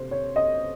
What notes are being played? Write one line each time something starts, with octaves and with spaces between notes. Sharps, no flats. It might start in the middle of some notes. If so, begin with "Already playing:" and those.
Already playing: C3 C5
C#5
D#5